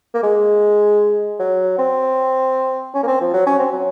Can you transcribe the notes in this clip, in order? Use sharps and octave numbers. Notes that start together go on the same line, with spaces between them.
A#3
G#3
F#3
C4
C#4
A#3
C4
F3
F#3
C#4
C4
F#3